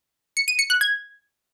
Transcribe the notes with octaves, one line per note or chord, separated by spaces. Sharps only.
C#7
D#7
C#7
F#6
G#6